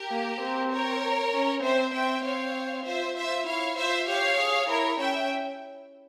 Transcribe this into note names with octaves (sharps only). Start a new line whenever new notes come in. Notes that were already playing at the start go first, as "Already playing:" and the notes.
Already playing: G4 A#4
A#3
C4
A#4 C#5
C#4
C4 C5 E5
C4 E5 G5
C4 C#5 F5
F4 C5 E5
F4 C5 E5
E4 C#5 F5
F4 C5 E5
G4 C#5 F5
G#4
E4 A#4 C#5
C#4 E5 G5